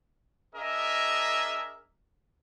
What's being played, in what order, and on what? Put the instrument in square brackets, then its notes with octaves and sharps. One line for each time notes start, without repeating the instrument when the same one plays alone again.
[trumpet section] D4 G#4 A#4 D#5 E5